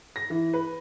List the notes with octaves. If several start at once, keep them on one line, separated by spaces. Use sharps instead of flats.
A#6
E3
B4